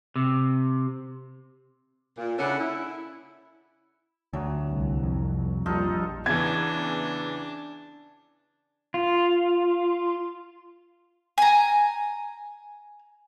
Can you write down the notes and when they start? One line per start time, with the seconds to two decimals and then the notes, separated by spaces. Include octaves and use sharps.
0.16 C3
2.18 A#2
2.38 C#3 C#4 D4 E4 A4 F#5
2.59 E4
4.33 D2 F#3
4.68 C2
5.03 F2
5.66 A#1 G3 D#4 F4 A4
6.26 E2 C#3 E3 D4 G#6
8.94 F4
11.38 G#5 A#5